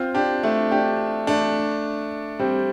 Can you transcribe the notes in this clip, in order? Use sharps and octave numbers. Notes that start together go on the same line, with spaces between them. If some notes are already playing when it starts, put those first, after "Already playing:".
Already playing: C4 F4
D4 G4
A3 D4
D4 G4
A3 D4
G3 C4